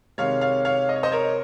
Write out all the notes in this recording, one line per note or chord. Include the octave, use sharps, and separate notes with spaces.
C3 D#3 G#3 C#5 F5
C#5 F5
C#5 F5
D#5
C#5
C5 D#5
A#4 C#5